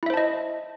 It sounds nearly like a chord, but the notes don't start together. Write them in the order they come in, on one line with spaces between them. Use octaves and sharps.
E4 E5 C5 A5 D#5